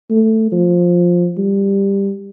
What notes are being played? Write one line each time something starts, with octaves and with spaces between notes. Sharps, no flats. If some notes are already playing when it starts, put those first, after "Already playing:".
A3
F3
G3